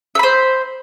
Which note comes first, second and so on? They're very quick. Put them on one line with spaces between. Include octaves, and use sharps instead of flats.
E5 B5 C5